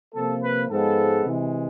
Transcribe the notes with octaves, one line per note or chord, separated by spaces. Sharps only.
C3 F3 A#3 A4
B4
G#2 F3 G#3 B3 A4
C3 E3 G#3